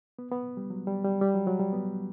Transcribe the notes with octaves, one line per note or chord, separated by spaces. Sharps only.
B3
B3
G3
F#3
G3
G3
G3
F#3
F#3
G3
B3